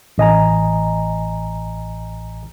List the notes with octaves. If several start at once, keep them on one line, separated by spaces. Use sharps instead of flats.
A1 D#5 G#5 A#5